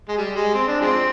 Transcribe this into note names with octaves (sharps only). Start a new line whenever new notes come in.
G#3
G3
G#3
C4
D4
F3 G#3 C4